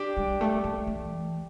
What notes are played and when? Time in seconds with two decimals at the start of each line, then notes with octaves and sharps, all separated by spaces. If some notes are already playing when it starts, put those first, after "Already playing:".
Already playing: D4 G4
0.17 G3
0.41 A3
0.64 A3
0.87 E3